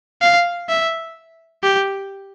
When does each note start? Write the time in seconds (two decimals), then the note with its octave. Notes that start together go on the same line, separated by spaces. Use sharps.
0.21 F5
0.69 E5
1.63 G4